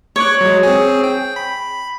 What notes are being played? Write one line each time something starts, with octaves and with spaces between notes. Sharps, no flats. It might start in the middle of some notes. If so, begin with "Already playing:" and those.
C#5 C#6 D6 F#6
F#3 G#3
C4 G#4
G5
B5